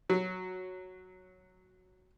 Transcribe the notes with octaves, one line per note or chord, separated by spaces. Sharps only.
F#3